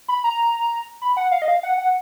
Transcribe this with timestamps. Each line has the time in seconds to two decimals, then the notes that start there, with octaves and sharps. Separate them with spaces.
0.08 B5
0.24 A#5
1.02 B5
1.17 F#5
1.31 F5
1.42 D#5
1.48 F5
1.63 F#5
1.78 F#5